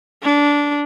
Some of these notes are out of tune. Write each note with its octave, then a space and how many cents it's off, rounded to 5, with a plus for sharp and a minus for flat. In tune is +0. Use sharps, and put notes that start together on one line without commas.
D4 -15